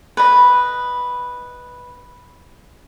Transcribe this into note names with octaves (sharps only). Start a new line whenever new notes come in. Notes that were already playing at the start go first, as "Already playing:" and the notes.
B4 D#5